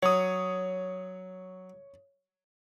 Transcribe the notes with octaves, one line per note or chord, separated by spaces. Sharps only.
F#3 C#5 D#6